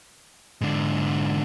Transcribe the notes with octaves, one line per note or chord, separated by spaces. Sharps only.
G#2 D3